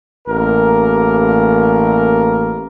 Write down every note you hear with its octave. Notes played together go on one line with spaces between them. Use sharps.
A1 A#3 A#4